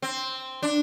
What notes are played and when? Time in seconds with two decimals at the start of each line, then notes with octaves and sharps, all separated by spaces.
0.02 C4
0.63 D4